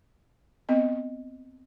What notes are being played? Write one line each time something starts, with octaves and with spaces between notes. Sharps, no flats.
B3 C4 D#5